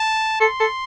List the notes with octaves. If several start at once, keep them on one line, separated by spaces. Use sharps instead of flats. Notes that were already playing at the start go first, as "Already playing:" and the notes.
Already playing: A5
A4 C6
A4